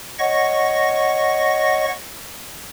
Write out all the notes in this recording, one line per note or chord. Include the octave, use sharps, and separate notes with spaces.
C#5 D#5 F#5 C#6 A#6